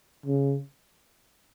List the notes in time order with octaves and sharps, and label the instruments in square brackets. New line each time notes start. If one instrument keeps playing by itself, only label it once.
[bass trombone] C#3